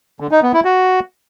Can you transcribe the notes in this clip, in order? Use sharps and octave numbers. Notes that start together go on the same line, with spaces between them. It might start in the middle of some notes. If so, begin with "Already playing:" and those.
D3
D#4
B3
E4
F#4